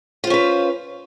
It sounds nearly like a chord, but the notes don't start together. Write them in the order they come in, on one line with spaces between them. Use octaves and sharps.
F4 C5 C#4 B4